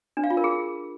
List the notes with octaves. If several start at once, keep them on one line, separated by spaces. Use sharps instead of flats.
D4
F5
F4
A#4
G#4